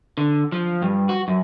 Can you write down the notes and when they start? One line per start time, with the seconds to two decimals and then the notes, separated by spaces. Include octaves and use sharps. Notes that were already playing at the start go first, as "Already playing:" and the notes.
0.18 D3
0.52 F3
0.82 G2
1.09 F#4
1.28 F#2